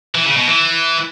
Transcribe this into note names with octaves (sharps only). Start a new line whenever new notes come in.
E3
C#3
B2
E3